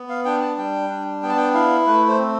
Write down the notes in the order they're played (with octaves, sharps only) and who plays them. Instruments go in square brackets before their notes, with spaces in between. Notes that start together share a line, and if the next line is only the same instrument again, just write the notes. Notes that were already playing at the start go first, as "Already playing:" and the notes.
Already playing: [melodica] B3
F5
D4 G5
A5
G3 G5
D4
B3 G5
A5
G5
E4 F5
A3 B4
C5
C4